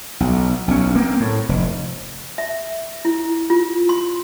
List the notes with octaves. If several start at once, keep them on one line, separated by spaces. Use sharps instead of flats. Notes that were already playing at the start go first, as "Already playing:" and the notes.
B1
B1 C#4
A#3 C4
A2
F1
E5
E4
F4
C6